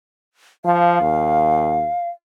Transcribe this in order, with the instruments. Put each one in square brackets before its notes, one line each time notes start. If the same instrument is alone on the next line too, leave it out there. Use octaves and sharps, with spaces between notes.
[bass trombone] F3 [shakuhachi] F5
[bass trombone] D#2